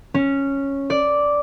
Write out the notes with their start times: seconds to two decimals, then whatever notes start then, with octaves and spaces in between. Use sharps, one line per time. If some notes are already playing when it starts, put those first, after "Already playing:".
0.14 C#4
0.90 D5